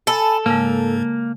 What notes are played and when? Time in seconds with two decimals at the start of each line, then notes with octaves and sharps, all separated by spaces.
0.07 A4 G#5 A5 B5
0.46 G#2 C#3 G#3 A#3